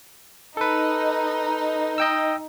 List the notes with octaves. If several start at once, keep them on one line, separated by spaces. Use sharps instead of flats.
D#4 A4 B4
D#5 G5 E6